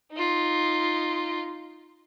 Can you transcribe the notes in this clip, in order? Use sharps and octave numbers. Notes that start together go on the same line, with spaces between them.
D#4 F4